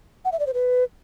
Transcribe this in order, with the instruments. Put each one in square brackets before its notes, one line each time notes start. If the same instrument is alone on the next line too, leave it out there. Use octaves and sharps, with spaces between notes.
[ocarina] F#5
E5
D5
C5
B4